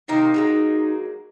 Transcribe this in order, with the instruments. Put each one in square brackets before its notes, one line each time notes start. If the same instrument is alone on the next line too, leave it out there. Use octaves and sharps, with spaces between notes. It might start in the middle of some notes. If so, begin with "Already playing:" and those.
[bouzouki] C3 D#3 A#3 [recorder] D#4
[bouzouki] F#3 G#3 A#3